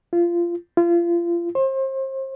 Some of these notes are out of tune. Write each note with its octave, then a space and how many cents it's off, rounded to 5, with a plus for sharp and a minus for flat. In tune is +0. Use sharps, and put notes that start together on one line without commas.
F4 -20
F4 -30
C5 +35